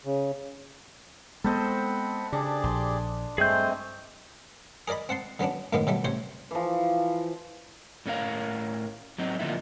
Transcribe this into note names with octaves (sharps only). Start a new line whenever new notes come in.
C#3
G#3 B3 C4 A4 C5 D#5 F#5 B5
C#3 D4 G4 G#4 D5
A#1 C6
G2 G#3 A3 C4 G#4 G6
G#4 A#4 D5 D#5 B5
C4 F#5 A5 C6
D3 F#3 B3 C#4 D4
F#2 A2 D#3 G#3 A#3 B3
B2 F#3 G3 A3
A1 C3 C5 C#5
E3 F3
A2 C#4 A#4 F5
F#3 C4 D#4
D3 F3 A#3 D#4 E4